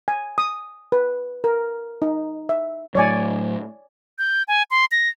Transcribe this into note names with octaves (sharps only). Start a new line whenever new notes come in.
G#5
D#6
B4
A#4
D#4
E5
A2 F#3 C#5 D5 G#5
G6
G#5
C6
A#6